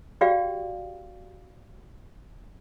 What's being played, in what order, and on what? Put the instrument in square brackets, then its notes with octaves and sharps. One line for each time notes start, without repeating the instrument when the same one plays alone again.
[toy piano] F#4 G4 D5 F5 G5